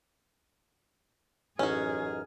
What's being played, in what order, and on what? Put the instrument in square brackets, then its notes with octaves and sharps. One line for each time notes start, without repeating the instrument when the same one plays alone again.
[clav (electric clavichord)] A1 [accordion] F#2 D#4 F6 [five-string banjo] C#4 F#4 [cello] G#4